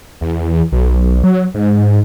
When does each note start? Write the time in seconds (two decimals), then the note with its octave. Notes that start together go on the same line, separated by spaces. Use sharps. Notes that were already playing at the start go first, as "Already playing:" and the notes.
0.21 E2
0.72 B1
1.24 F#3
1.54 G#2